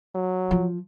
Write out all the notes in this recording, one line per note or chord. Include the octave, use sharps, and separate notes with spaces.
F#3
F3